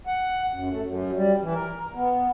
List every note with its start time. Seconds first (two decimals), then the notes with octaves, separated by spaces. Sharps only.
0.07 F#5
0.53 F#2
0.70 A3
0.85 F#2
1.15 G3
1.41 E3
1.54 A#4
1.94 B3